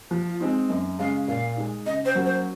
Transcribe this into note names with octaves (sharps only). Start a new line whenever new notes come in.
F3
F4
G#3 C4 D#4
F#2 D#5
C#3 G#3 C#4 F5
A#2 F5
G#3 D#4
C#3 D#5
C5
F#3 A#3 C#4 F#4
C5